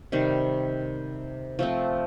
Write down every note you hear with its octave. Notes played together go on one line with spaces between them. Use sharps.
C3 D#3 G3
F3 A3 C4